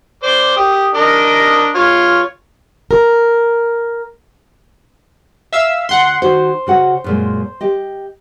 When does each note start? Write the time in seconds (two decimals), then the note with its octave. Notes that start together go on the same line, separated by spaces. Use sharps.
0.23 C5 D5
0.57 G4 D#6
0.94 D4 A#4 D#5
1.75 F4 C#5
2.91 A#4
5.53 E5 F5 E6
5.89 D2 F#5 C6
6.22 D#3 F#4 C5
6.67 C#3 F#4 F#5
7.04 F#2 A#2 G#3
7.61 G4 D#5